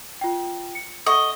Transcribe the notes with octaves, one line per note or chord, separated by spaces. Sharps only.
F4 G5
C#7
A4 D#5 F#5 C#6